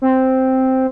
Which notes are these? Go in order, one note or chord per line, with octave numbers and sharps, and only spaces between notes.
C4